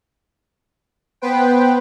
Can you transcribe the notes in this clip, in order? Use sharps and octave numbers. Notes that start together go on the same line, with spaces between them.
B3 B4 C5 G5